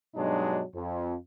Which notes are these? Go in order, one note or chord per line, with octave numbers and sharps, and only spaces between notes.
G2 B2 F#3 G#3 D4 D#4
F2